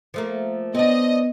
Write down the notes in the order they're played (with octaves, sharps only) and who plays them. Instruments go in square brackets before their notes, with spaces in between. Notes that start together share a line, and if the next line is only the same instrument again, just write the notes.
[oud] F3 A3 A#3
[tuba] B3 [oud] C4 D4 [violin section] D#5